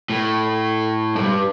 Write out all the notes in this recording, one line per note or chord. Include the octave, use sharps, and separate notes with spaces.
A2
G2